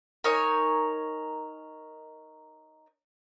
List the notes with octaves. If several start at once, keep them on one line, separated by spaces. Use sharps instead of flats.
D#4 A#4 C#5 G#5